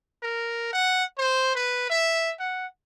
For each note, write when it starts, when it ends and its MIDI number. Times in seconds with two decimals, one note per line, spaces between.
0.23 0.73 70
0.73 1.04 78
1.18 1.53 72
1.55 1.87 71
1.90 2.33 76
2.40 2.66 78